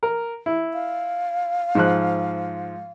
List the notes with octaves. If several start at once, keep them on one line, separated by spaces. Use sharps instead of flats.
A#4
E4
F5
G#2 F3 F#6